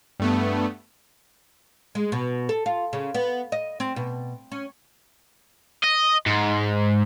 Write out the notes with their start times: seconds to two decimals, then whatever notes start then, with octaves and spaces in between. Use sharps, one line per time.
0.20 G2 A3 B3
1.95 G#3
2.12 B2
2.49 A4
2.66 F4
2.93 C#3
3.15 B3
3.52 D#5
3.80 C4
3.96 B2
4.52 C#4
5.84 D#5
6.26 G#2